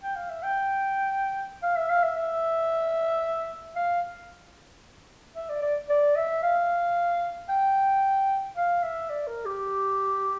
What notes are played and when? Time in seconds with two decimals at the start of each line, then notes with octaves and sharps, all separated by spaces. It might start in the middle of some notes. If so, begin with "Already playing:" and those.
0.03 G5
0.16 F5
0.29 E5
0.43 G5
1.63 F5
1.76 E5
1.89 F5
2.03 E5
2.16 E5
3.76 F5
5.36 E5
5.49 D5
5.62 D5
5.89 D5
6.16 E5
6.43 F5
7.49 G5
8.56 F5
8.83 E5
9.10 D5
9.27 A#4
9.45 G4